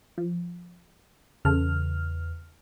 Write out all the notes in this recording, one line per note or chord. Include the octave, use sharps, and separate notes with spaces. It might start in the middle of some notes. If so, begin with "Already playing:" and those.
F3
E2 C#3 A4 F6